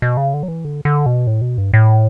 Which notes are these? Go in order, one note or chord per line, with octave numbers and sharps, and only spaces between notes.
B2
C#3
D3
F#3
E3
D3
D3
B2
A2
B2
G2
A2